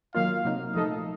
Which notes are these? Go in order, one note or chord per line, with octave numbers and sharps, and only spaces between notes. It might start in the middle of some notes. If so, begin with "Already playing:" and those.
D#3 F#3 A#3 F4 F5
C3 F#3 A#3 D#4
A#2 F3 A3 D#4 A4 D#5